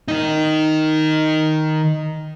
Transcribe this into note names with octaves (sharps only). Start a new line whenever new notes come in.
D#3 D#4